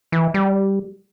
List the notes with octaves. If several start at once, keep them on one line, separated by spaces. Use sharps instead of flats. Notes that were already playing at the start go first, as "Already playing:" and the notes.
E3
G3